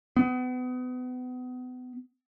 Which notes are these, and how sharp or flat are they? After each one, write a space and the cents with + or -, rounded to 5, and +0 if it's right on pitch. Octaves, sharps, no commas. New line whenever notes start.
B3 +30